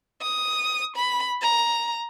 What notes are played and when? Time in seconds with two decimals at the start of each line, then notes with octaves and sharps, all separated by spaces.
0.21 D#6
0.96 B5
1.42 A#5